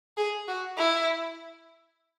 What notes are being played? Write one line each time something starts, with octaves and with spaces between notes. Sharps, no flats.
G#4
F#4
E4